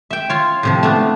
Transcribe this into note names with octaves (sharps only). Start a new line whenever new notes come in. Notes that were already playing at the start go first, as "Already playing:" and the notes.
E5 G5
F4 C#5
A2 C3 F3
A3 B3 D4